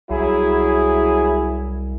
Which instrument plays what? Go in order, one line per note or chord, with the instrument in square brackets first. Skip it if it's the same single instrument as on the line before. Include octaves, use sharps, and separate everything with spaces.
[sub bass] C2 [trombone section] F#3 E4 G#4